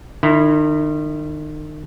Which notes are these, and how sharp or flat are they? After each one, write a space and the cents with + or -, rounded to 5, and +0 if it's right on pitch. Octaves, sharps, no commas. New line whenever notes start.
D#3 -40 E4 +0